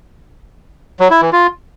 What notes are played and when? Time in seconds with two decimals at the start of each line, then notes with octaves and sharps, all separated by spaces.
1.00 F#3
1.11 E4
1.22 E3
1.33 F4